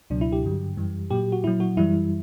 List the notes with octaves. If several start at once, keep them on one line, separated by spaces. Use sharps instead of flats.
C#2 B2 F#3 D4
E4
G4
G2 D3 F#3
F#2 E3 G3
A#2 F#3 G4
F#4
A#2 F#3 E4
F#4
F#2 E3 G3 E4